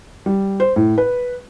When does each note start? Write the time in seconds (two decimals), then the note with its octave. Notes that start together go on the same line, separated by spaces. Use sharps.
0.26 G3
0.60 C5
0.76 A2
0.98 B4